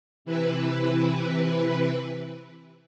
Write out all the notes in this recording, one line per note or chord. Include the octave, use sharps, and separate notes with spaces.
C3 E3 E4 B4